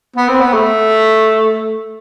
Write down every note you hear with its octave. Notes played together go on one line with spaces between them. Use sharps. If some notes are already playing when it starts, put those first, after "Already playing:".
B3
C4
B3
A3